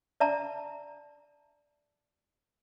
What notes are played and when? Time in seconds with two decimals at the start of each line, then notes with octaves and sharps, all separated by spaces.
0.20 D5 E5 A5 A#5